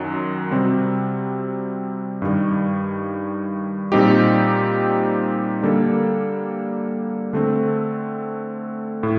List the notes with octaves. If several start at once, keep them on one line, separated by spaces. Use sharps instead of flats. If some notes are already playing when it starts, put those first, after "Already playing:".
Already playing: F#2 D#3 F#3
C3 G3 C4 F#4
G2 D#3 G3
A#2 G3 C4 D#4 G4
D3 G3 A#3 D4 A4
D3 A3 C4
A2